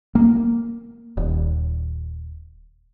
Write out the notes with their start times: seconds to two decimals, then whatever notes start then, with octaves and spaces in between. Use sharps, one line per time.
0.15 A#3
1.17 D#1